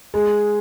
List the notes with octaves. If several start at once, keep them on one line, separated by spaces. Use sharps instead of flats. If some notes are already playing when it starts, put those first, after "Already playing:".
G#3